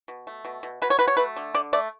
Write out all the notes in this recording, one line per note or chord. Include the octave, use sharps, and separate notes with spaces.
B2
A3
B2
B2
F#3 B4
C#5
F#3 B4
C#5
A3 B4
D3
D3 D5
A3 D5